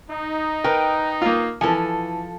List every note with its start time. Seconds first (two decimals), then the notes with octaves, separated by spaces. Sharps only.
0.11 D#4
0.64 A#4 B4 G5
1.22 A#3 F4
1.61 E3 F3 A4 G#5